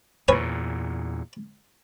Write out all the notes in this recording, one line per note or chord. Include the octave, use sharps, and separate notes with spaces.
E2 A#2 B4 C#5 G#5